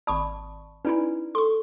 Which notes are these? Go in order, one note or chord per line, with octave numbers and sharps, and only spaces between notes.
G#1 D5 A5 B5 C#6 D#6
C#4 D#4 E4 B4 D5 G#5
A4 C6 C#6